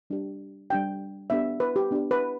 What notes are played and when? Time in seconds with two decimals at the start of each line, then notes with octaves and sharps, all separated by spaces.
0.10 G3 D4 G4
0.70 G3 D4 G4 G5
1.30 B3 D4 G4 E5
1.60 B4
1.76 G4
1.91 B3 D4 G4
2.11 B4